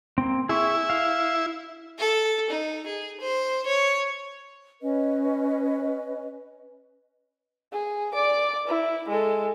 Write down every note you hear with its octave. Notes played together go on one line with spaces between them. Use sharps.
A#3 C4
E4 G#4 E5 C#6
F5
A4
D#4
G#4
C5
C#5
C#4 B4 D#5
G#4
D5 D6
E4
G#3 A4